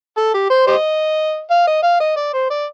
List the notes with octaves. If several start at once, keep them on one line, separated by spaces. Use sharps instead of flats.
A4
G4
C5
G4 C5 D#5
F5
D#5
F5
D#5
D5
C5
D5